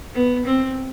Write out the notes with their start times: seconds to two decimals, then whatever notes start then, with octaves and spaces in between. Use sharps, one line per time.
0.14 B3
0.46 C4